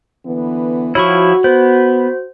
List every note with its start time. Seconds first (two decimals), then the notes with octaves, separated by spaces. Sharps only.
0.25 D3 E3 B3
0.95 F3 E4 F#4 C#5 B5 C#6
1.44 B3 C5